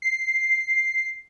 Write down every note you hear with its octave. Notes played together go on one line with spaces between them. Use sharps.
C7